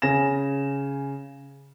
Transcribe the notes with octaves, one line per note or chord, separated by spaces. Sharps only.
C#3 G#5 A#6 E7